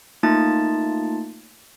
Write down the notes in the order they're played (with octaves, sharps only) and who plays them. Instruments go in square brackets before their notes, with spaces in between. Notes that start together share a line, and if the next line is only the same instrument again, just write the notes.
[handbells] A3 A#3 D#4 F4 A5 A6